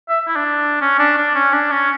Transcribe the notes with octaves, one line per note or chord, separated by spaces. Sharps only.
E5
E4
D4
C#4
D4
D4
C#4
D4
C#4